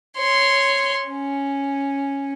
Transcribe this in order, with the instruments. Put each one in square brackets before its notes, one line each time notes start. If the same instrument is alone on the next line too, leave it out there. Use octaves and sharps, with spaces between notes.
[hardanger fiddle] C#5 C6
C#4